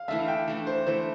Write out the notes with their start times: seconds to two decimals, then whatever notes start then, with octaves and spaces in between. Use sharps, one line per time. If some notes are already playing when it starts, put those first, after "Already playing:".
Already playing: F5
0.08 E3 A3 D4 E5
0.19 F5
0.28 G5
0.48 E3 A3 D4
0.67 C5
0.86 E3 A3 D4 C5